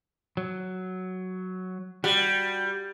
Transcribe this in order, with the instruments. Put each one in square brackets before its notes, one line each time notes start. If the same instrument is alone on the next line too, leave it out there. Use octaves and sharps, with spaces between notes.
[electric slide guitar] F#3
[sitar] G3 [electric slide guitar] F#4 G4